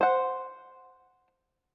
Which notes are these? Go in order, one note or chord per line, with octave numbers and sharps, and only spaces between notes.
C5 F#5